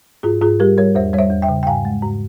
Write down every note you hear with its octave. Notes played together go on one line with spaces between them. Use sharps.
G#2 F4 G#4
G#2 F4 G#4
G3 G4 A#4
G3 A#4 C#5
E2 C5 E5
G3 C#5
C5 E5
E2
E5 G5
C#3
G5
G#2 F5 G#5
G#3
G#2